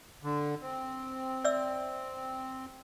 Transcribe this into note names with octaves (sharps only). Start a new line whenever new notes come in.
D3
C4
D5 E5 E6